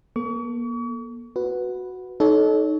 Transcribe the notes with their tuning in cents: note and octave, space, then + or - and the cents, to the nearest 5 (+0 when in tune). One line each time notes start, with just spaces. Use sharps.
A#3 +40 A4 +10 C#6 +40
F#4 -5 B4 +0
D#4 -5 A4 -25 C#5 +25